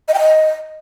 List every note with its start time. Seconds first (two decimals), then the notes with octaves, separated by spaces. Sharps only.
0.08 D#5
0.14 G5
0.20 D#5